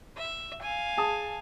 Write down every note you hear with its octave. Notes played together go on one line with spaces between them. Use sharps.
E5
F5 G#5
G#4 A5 D#6